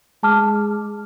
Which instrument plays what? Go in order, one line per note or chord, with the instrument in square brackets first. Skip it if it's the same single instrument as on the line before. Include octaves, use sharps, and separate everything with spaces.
[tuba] G#3 [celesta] A5 D6 F6